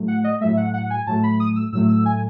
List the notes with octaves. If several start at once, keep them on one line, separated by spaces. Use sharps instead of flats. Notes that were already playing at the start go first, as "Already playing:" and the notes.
Already playing: A2 F#3 A3
F#5
D#5
A2 F#3 A3 E5
F#5
F#5
G#5
A2 F#3 A3 A5
B5
D#6
E6
A2 F#3 A3 E6
E6
G#5